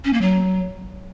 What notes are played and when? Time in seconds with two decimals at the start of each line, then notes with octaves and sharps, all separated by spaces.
0.05 C#4
0.13 A#3
0.21 F#3